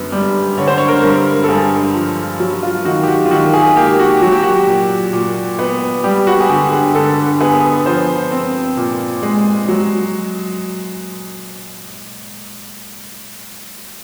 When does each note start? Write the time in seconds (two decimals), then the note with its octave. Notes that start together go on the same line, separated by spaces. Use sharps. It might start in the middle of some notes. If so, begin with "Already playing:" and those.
Already playing: F#2 D3 B3
0.12 G3
0.58 D3 C#5
0.68 C5
0.78 C#5
0.88 A#4
1.03 G2
1.19 A#4
1.44 A4
1.48 G2 G#4
1.94 F3
2.40 F#3
2.63 F4
2.85 D#3 F#4
3.03 G4
3.08 F#4
3.26 F4
3.31 D#3 F#4
3.53 G#4
3.76 A#3 G4
3.99 F#4
4.22 F#3 F#4
4.32 G4
4.42 F#4
4.67 A#2
5.13 A#2
5.59 B3
6.04 G3 G4
6.27 F#4
6.40 G#4
6.49 D3 G4
6.72 G#4
6.95 D3 A4
7.41 B3 G#4
7.86 F3 C5
8.32 C4
8.77 A#2
9.23 G#3
9.68 F#3